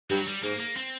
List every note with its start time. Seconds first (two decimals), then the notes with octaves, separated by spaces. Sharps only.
0.10 G2 F#3
0.26 G3
0.43 G#2 A#3
0.60 A#3
0.77 C4